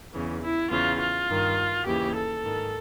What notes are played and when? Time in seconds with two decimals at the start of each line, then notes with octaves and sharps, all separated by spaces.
0.13 E2 C#3 E3
0.42 E4
0.70 E2 C#3 E3 F4
1.00 F4
1.28 G2 D#3
1.86 D#2 C#3 E3 G4
2.15 A4
2.44 G#2 D#3